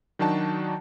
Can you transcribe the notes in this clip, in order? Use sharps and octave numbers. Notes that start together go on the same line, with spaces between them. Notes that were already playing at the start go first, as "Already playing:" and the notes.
D#3 F#3 D4 D#4 F#4 A5